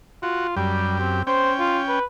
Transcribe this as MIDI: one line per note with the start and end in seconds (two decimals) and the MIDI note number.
0.23 0.55 65
0.23 0.47 66
0.57 1.22 42
0.57 0.98 55
0.57 1.22 67
1.00 1.22 60
1.27 1.99 61
1.27 1.53 72
1.27 1.99 79
1.60 1.80 65
1.88 2.04 71